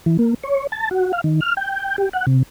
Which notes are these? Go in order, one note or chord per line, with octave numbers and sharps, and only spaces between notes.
E3
A#3
C#5
A5
F#4
F5
D#3
F6
G5
G4
F#5
C3